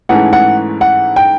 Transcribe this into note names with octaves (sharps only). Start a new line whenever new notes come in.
G#2 E3 A3 C#4 F#5
F#5
F#5
G5